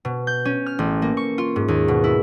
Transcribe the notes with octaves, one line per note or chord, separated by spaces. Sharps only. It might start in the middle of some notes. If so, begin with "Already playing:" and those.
B2
G6
C#4
F6
A1
A#3
C#6
F4
G#2
D#2
B2
E4